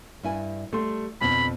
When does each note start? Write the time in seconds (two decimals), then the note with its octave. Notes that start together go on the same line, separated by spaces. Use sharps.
0.23 G2 E4 G#5
0.73 G3 A3 C6
1.21 F2 B2 D3 B5